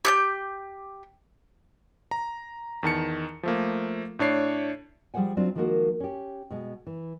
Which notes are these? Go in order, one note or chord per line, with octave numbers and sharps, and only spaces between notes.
G4 F#6 G6
A#5
E2 D#3 A5 C#7
F3 A3 A#3
A2 D4 C#5 C7
F3 G3 G#4 C5 F#5 G#5
F#3 C4 D4 F4
D#3 F3 G#3 A#3 F#4 A#4
C#4 G4
B2 G#3
E3